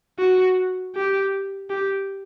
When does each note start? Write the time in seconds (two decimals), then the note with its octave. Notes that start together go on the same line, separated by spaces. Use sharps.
0.19 F#4
0.95 G4
1.70 G4